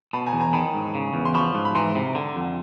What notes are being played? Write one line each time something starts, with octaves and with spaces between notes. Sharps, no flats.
B2 A5 B5
G#5 A#5
E2
G#5 A#5
D#3 A5 B5
G#2
C#3
E2
C6
F3 B5 C#6
G#2
B5
E3 A#5 C6
C3
D3
F2